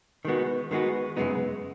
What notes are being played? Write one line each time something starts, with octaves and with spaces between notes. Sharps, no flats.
D#3 G#3 B3 F#4
D#3 G#3 B3 F#4
F#2 C#3 G#3 B3 D#4